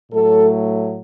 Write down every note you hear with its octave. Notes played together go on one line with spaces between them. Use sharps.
A2 F#3 A3 A4